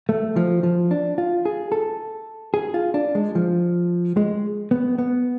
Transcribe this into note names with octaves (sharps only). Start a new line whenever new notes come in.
A3
F3
F3
D4
F4
G#4
A4
G#4
F4
D4
G#3
F3
G#3
B3
B3